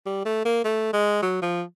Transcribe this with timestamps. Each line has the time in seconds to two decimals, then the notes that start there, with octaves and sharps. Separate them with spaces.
0.06 G3
0.25 A3
0.45 A#3
0.64 A3
0.93 G#3
1.22 F#3
1.42 F3